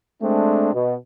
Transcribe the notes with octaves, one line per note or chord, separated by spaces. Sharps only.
G#3 A3 C4 D4
B2